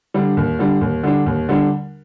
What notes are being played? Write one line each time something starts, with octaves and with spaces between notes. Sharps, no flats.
D3 G3 D4
D#2
D3 G3 D4
D#2
D3 G3 D4
D#2
D3 G3 D4